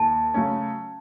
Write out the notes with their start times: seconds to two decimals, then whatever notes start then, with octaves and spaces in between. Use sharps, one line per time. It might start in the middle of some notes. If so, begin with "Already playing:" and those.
Already playing: D#2 A5
0.34 C#3 F#3 A3 C#4